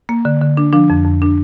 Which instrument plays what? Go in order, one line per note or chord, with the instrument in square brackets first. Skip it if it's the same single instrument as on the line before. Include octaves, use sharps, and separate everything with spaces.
[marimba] A#3
D3
D3
D4
F3 D4
F2
F2
D4